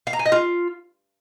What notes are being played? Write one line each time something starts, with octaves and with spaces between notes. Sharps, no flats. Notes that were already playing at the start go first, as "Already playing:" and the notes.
F5
A#5
G#5
D#5
F4